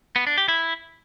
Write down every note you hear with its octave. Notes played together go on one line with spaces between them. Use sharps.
B3
D4
G4
E4